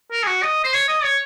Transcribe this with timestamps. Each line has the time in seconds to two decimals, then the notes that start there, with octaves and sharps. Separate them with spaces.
0.12 A#4
0.23 G#4
0.27 F#4
0.43 D#5
0.64 C5
0.73 C#5
0.88 D#5
1.04 C#5